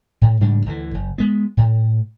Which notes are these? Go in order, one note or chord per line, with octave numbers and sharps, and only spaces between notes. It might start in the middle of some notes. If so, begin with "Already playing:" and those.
A2
G#2 C#3 G3 D4
D2 D3 E3
F#1
G#3 B3
A2